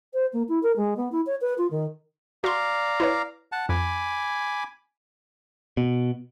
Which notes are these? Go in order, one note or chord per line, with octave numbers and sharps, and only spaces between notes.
C5
A#3
E4
A#4
G#3
B3
E4
C#5
B4
F4
D#3
F#4 D5 F5 A#5 C6
E4 B4 C#5
F#5 A5
F2 G#5 B5 D6
B2